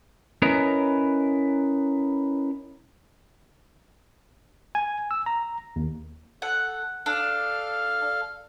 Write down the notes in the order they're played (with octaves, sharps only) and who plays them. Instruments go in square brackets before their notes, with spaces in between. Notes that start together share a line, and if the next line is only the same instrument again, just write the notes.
[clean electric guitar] C#4 E4 A#4 B4 D#5 A#5
[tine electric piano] G#5
E6
A#5
D#2
[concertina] A4 [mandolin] F#5
[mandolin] D4 [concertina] A4 F5 F6